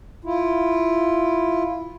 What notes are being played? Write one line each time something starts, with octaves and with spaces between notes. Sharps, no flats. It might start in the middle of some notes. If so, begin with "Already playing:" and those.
E4 F4